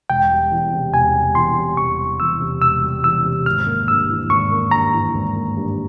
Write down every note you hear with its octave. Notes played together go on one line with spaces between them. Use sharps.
E1 G5
G3
E2
C3
E1 G#5
G3
E2 C6
C3
E1 C#6
G3
E2 E6
C3
E1 E6
G3
E2 E6
C3
G#1 F6
A#3
G2 E6
E3
G#1 C#6
A#3
G2 A#5
E3
G#1
A#3
G2